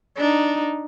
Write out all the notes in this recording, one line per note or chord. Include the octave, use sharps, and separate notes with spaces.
D4 D#4